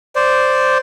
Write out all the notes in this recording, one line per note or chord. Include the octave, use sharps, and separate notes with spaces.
C5 D5